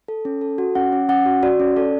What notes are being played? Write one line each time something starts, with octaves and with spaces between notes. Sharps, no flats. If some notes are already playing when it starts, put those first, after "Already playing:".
A4
C#4
A4
F#4
C#4 F#5
C#4
C#4 F#5
F#4
F#4 D5
C#4
A4 D5